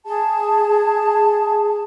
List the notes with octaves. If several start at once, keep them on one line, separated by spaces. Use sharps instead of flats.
G#4 A5